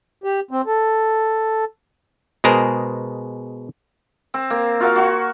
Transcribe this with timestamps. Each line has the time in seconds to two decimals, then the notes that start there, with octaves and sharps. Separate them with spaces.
0.24 G4
0.51 C4
0.66 A4
2.44 B2 G#3 G#4 A#4 C5
4.34 C4
4.50 A#3
4.80 F4 F#4 A#4 F5
4.96 F#4 C#6